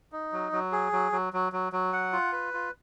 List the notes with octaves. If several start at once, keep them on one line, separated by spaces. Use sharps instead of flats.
D#4
F#3
F#3
G#4
F#3
F#3
F#3
F#3
F#3
F#5
F4
B4
F4